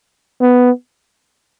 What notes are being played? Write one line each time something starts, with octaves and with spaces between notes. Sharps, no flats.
B3